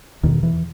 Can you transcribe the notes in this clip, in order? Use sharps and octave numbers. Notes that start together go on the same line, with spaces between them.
E2 B2 D#3
E3